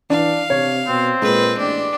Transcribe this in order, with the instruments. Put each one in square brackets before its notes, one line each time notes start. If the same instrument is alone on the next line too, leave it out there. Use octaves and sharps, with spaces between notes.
[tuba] E3 [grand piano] D4 [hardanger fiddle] F5
[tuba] C3 [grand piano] C#5
[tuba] B2 [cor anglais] C4
[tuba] A#2 [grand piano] G#3 [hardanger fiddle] B4
[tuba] A1 [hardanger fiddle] D4 G4